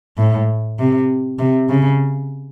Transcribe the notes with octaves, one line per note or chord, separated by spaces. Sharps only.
A2
C3
C3
C#3